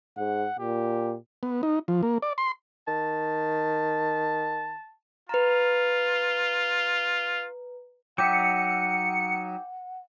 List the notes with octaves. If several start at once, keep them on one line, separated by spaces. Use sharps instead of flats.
G#2 F#5
A#2 G4
B3
D#4
F3
A#3
D5
C6
D#3 A5
F4 B4 A#5
F#3 D#4 E5 F#5 G5 D6 G6 C#7